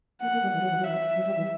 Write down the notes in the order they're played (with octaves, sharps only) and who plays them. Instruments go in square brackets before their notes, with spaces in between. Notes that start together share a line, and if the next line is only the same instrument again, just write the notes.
[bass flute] A#3 [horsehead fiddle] F#5
[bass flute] A#3
G3
E3
F#3
E3
F#3
[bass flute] E3 [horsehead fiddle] E5
[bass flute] F#3
G3
E3